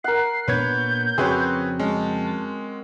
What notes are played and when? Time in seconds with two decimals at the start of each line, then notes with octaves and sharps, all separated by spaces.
0.04 A#4 F#5 C7
0.48 A#2 B3 D4 B4 C#5 G6 G#6
1.18 F2 C#3 C4 F#4 G#4 B4 C#5 G5
1.79 G#3 C#4 A5